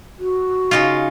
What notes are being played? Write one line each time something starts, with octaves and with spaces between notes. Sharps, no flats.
F#4
C#3 D#4 F4